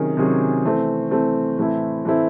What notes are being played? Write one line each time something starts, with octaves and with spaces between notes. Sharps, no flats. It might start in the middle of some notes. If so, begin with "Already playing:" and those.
Already playing: C3 D#3 F#3 C#4 G#4
C3 D#3 F#3 C#4 G#4
E3 A3 C4
E3 A3 C4
A2 E3 A3 C4 E4
A2 E3 A3 C4 E4